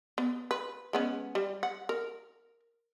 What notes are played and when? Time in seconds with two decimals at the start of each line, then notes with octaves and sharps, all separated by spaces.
0.18 B3
0.51 B4
0.93 G#3 B3 C#4
1.35 G3
1.63 F#5
1.89 A#4